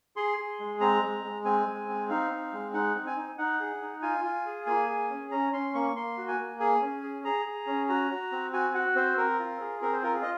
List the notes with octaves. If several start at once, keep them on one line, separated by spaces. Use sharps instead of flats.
G#4 C6
G#4
G#3
C4 A#5
G#3
G#3
C4 G#5
G#3
C4
D#4 F5
C4
G#3
D#4 F#5
C4
G#5
D#4
D#4 F#5
G#4
D#4
F4 G#5
F4
G#4
A#3 G#5
G#4
C#4
C#4 A#5
C#4 C6
A#3 C#6
A#3 C6
F#4
G#5
A#3
G#4 G#5
C#4
G#4
G#4 A#5
G#4
C#4
F#4 A#5
F#4
C4
F#4 G#5
F#4 F#5
C4 C5
C4 A#4
F4
G#4
C4 A#4
C5
F4 A#4
G#4
D#5